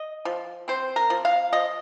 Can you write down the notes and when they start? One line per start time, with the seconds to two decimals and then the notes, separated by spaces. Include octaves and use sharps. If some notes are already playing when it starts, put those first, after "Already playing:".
Already playing: D#5
0.25 F3
0.68 C4 C5
0.96 A#4
1.10 F3
1.25 F5
1.53 F3 D#5